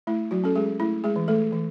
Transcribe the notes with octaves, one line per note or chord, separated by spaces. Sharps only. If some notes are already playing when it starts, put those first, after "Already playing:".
A3 E4
F#3 F#4
C#4 A4
G#3 G#4
A3 E4
G#3 G#4
E3
A3 A4
E3